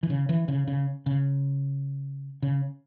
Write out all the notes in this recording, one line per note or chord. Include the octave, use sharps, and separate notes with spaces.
E3
C#3
E3
C#3
C#3
C#3
C#3